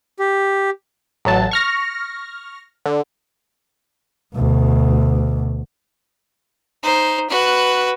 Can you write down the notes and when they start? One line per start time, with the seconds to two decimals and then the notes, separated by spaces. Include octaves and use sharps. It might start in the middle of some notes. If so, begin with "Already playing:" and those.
0.19 G4
1.25 A1 F#3 A5
1.51 C#6 F6 A#6
2.86 D3
4.35 D2 B2
6.83 D#4 C5
7.30 F#4 B4